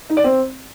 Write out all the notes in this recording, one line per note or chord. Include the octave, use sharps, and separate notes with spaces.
D#4
D5
C4